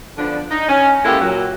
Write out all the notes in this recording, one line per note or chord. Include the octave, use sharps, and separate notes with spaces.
D3 F3 B3 D4
D#4
C#4
G#3 A#3 B3 E4 G4 A4
A#2 F#3